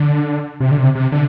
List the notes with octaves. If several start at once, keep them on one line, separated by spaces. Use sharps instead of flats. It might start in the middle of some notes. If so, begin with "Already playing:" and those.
Already playing: D3
C3
D3
C3
C3
D3